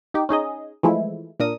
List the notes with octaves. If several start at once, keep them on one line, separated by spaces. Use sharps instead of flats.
D#4 G4
C#4 D#4 G#4 D#5
E3 F3 G#3 A3 E4
A#2 D4 A#4 D#6